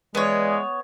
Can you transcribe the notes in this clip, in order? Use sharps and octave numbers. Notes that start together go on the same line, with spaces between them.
E3 G#3 B3 C#5 D5